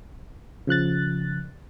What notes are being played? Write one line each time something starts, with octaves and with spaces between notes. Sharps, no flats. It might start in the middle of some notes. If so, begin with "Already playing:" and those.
C#3 F3 F#6 A6